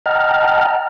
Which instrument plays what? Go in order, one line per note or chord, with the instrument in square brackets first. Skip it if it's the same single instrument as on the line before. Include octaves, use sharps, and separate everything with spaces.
[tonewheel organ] D#5 F#5 G5 A5 A#5 F6